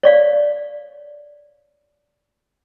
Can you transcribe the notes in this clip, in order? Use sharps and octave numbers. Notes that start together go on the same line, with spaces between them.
C#5 D5 F5